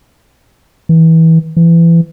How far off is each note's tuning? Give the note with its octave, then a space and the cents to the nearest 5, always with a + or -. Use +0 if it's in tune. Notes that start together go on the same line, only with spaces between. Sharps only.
E3 -25
E3 +25